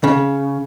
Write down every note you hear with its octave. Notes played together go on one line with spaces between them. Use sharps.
C#3